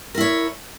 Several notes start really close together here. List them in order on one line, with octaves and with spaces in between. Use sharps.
A#4 E4 C#5